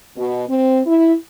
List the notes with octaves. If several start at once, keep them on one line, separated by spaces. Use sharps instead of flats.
B2
C4
E4